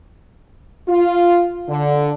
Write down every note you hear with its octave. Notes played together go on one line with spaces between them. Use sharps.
F4
D3